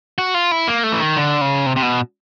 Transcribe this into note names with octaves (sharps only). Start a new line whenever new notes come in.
F#4
F4
E4
A#3
A3
E3
D#3
D3
C#3
C3
C3
B2